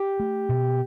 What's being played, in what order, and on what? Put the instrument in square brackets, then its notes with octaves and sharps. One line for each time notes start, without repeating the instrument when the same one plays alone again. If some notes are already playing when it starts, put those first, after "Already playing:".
Already playing: [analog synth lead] G4
[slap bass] A3
B2